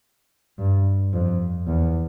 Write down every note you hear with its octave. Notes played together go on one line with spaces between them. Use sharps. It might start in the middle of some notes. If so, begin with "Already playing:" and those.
G2
F2
E2